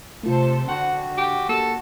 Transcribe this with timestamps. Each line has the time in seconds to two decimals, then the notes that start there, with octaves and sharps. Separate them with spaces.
0.23 C3 A3 F4 A4 C5
0.68 D3 F#4 F#5 G5
1.17 G4
1.49 A#3 G4 A4